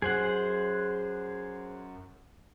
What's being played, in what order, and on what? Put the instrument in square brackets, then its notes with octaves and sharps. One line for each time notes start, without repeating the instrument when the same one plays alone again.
[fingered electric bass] F#2 [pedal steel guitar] G#4 C5 F#5